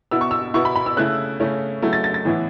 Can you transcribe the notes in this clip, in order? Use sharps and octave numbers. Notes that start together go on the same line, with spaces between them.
B2 B3 E4 E6
C#6
E6
B2 B3 E4 C#6
B5
B5
E6
C#3 A3 E4 F#6
C#3 A3 C#4 E4
C#3 F#3 A3 E4
A6
A6
A6
A2 E3 B3 E4